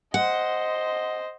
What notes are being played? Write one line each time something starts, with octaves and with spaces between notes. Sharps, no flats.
C5 D#5 F#5